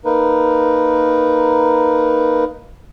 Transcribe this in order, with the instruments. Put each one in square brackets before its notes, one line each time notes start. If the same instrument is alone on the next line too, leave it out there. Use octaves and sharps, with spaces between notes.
[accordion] A#3 D#4 A#4 B4